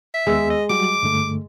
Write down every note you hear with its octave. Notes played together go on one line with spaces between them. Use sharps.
E5
D#2 G#3 B3 E6
D#5
F#3 G3 F#4 D6
G2 D3 A3